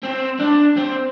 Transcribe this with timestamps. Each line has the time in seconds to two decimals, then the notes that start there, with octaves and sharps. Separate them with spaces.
0.03 C4
0.39 D4
0.77 C4